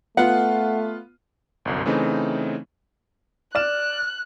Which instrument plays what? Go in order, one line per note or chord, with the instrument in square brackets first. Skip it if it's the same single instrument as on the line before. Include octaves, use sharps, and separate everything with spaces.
[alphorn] A3 [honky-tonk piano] B3 F4 [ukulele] F#5
[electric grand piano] G1 C2 F#2
C#3 E3 A3 C4 D#4
[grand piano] D5 F6 E7 [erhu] F#6